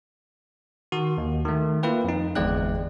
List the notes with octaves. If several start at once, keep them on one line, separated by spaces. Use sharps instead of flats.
D#3 F#4
D#2
D#3 A3
A#3 E4 F4 B4 G5
F2 D#4
G1 E2 G#3 D5 G5 F#6